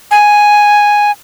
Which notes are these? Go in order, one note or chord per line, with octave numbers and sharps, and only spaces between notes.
G#5